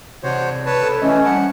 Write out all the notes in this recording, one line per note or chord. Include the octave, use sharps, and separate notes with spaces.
C3 D4 F#4 C5 C#5
B4 C#5 A5
A4 C5
E3 A3 C#4 D#5
G3 C5 F#5 A5